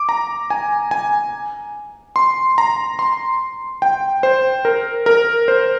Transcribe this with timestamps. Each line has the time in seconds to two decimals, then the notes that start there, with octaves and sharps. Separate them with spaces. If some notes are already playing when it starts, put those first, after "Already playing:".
Already playing: D6
0.09 A#5
0.50 G#5
0.91 G#5
2.16 C6
2.58 A#5
2.99 C6
3.82 G5
4.23 C5
4.65 A#4
5.06 A#4
5.48 C5